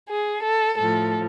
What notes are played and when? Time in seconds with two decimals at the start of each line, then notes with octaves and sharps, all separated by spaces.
0.09 G#4
0.43 A4
0.77 A2 F3 A4